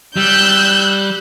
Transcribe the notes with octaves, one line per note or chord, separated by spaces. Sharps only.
G3 E6 F#6 G6